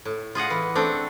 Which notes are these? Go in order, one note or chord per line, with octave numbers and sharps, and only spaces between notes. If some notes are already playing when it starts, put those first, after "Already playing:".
A2
F4 G#4 D#5 F#5
E3
A3 C4 D4